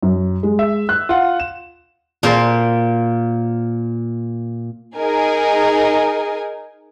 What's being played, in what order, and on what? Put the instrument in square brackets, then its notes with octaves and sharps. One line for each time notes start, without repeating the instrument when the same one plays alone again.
[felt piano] F#2
G#3
[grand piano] E5
[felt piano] F#6
[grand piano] F4 F#5
E7
[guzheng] A#2 A#4 C5
[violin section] D#4 G#4 A#4 G#5